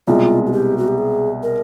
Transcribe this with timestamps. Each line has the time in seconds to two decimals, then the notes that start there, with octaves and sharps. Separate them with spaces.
0.07 C2 B2 G#3 F4
0.47 F#4
0.52 G4
0.78 F#4
0.88 G4
0.98 G#4
1.43 A#4